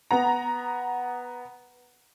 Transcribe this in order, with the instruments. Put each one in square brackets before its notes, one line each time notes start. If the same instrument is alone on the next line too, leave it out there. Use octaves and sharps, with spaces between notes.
[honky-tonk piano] B3 A#5